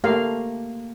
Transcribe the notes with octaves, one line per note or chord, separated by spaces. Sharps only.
A3 A#3 G4 F5